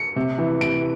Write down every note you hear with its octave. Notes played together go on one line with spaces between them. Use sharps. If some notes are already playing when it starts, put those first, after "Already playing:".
Already playing: C#7
C3
E3
C3 D7